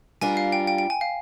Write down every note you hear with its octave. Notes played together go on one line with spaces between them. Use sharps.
G3 D4 F4 A#4 G#5
F5
G5
G5
G5
G#5
F5